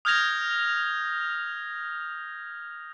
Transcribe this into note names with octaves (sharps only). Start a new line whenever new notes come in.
D#6 F6 G6 G#6 A#6 F7